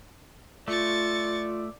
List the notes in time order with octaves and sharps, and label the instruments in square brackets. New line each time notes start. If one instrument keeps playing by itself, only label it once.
[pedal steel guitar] A3 [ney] F4 [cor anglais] D5 [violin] C#6 A6